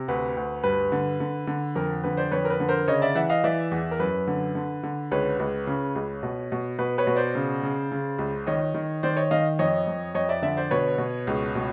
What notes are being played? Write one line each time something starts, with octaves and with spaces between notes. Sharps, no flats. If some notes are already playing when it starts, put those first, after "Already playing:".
Already playing: C3
D2 B4
D2
G2 B4
D3
D3
D3
F2 A#4
D3 B4
C5 D5
F2 B4 C#5
A#4
B4
D3
A#4 C5
C#3 C#5 D#5
D5 E5
E3 E5 F#5
D#5 F5
E3 D5 E5
E2
A#4
F#2 B4
D3
D3
D3
C#2 B4 C#5
C#2
C#3
C#2
B2
B2
B2 B4
B4 C#5
B2
C5 D5
C#3
C#3
C#3
C#2
D#3 C#5 D#5
D#3
D#3 C5 D5
C#5 D#5
D#3 D#5 F5
F2 C#5 D#5
F2
F2 C#5 D#5
D5 E5
D3 D5 E5
C5 D5
B2 B4 C#5
B2
C#2
B2